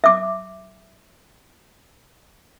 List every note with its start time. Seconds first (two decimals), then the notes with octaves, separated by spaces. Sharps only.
0.04 E5 D6